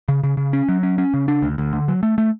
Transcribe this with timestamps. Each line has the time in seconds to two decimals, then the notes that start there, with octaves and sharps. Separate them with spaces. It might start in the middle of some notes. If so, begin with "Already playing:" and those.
0.08 C#3
0.24 C#3
0.37 C#3
0.53 C#4
0.69 F#3
0.83 C#4
0.98 C#4
1.14 C#3
1.28 D4
1.43 D2
1.58 D2
1.73 D3
1.88 F#3
2.03 A3
2.18 A3